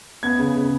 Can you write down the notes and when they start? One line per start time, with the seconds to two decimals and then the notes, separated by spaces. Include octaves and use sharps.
0.23 B3 G#6
0.39 C#3
0.55 C#3